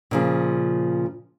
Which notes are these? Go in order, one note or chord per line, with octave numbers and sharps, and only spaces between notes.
A#2 C#3 F3